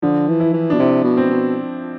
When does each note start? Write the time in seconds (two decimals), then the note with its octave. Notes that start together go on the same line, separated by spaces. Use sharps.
0.02 D3 F3
0.28 E3
0.40 E4
0.53 E3
0.70 B2 D4
0.79 C3 E4
1.04 B2
1.17 C4
1.30 B2